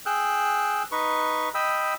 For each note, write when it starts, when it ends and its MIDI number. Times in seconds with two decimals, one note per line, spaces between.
0.06 0.83 68
0.06 0.83 79
0.06 0.83 88
0.06 0.83 90
0.92 1.49 63
0.92 1.49 71
0.92 1.49 85
1.55 1.94 75
1.55 1.94 79
1.55 1.94 83
1.55 1.94 88